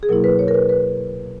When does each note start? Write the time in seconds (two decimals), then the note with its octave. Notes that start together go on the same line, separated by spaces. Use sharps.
0.03 G#4
0.09 B2 F#3 A#3 E4 A#4
0.24 B4
0.39 C#5
0.48 A#4
0.54 B4
0.69 B4